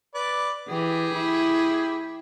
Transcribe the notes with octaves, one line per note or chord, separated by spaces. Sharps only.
B4 D5
E3 G4 G#4
E4